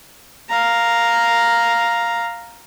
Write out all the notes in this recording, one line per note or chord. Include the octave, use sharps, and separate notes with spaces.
F5 A#5